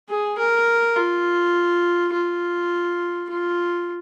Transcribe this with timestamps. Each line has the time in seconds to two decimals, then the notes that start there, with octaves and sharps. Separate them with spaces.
0.09 G#4
0.38 A#4
0.96 F4
2.12 F4
3.29 F4